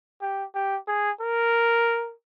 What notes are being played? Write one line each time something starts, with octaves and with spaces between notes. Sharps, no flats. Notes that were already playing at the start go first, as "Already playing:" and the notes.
G4
G4
G#4
A#4